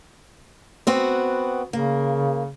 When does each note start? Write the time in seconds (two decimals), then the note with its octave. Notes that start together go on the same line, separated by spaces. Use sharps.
0.87 B3 C4 F#4
1.73 C#3 A#3